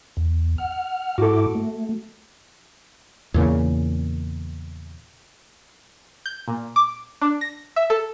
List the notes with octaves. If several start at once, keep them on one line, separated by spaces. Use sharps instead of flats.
E2
F#5 F6
G#2 E4 F#4 A4 D6
A3
E2 A#2 C#3
G6
A#2
D6
D4
A#6
E5
A4